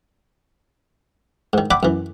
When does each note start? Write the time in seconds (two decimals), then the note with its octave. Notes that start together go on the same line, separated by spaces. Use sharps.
1.53 G#2 D#3
1.71 D5 E5 F#5 G5 B5 D6
1.83 F#2 E3